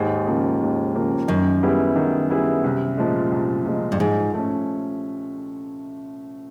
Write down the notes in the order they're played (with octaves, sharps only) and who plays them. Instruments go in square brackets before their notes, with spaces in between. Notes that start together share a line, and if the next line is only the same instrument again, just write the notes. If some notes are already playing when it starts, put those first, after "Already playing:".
Already playing: [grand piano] D#2 [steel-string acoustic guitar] G#2
[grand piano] C#3 F3 A#3
D#2
C#3 F3 A#3
[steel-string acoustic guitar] F#2 [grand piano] D#3
[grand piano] G3 B3 E4 G#4
D#3
G3 B3 E4 G#4
C2
A#2 F3 G#3
C2
A#2 F3 G#3
[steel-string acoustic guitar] G2
[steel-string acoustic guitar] G#2 [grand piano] F3
[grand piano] A3 C#4